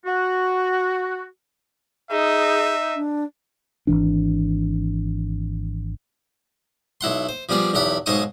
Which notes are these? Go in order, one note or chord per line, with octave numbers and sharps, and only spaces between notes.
F#4
D#4 G#4 E5
D4
G#1 C#2 E3 D4
B1 E4 F#5 C6
C5
F3 G3 B3 G#4 D5
B1 E2 G4 F#5 B5
B1 G#2 C5 C#5 C#6 D#6